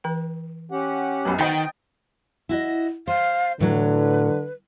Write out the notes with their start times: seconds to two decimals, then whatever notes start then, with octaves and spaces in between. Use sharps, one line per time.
0.04 E3 B4 G5
0.72 C#4 G4 F#5
1.25 B1 F#2 B4 A5 B5
1.39 D#3 D#4 C5 D#5 F#5 G5 A6
2.49 E4 F#4 D#5
3.07 C5 F5
3.60 A2 D3 F#3 B4